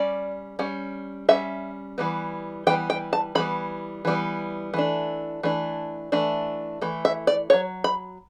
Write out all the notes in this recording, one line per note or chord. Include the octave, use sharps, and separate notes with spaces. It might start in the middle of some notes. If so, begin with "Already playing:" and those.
Already playing: G3 C#4 D5
G3 C#4
G3 C#4 E5
E3 G3 B3
E3 G3 B3 G5
G5
A5
E3 G3 B3 B5
E3 G3 B3
E3 A3 D4
E3 A3 D4
E3 A3 D4
E3 A3
E5
D5
F#3 C#4 C#5
B5